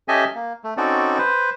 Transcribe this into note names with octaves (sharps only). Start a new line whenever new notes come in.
C#4 G4 A4 D#5 E5 G#5
A#3
A3
C4 C#4 D#4 F#4 A4 D5
B4 C5